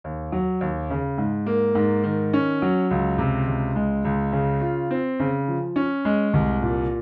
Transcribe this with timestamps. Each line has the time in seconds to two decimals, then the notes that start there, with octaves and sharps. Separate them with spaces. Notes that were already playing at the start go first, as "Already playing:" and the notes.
0.04 D#2
0.32 F#3
0.61 D#2
0.90 C#3
1.18 G#2
1.46 A#3
1.75 G#2
2.04 D#3
2.33 C#4
2.62 F#3
2.91 C#2
3.18 C3
3.47 C#2
3.76 G#3
4.05 C#2
4.33 C#3
4.61 F4
4.91 C4
5.20 C#3
5.48 F3
5.76 C#4
6.05 G#3
6.34 C2
6.62 A#2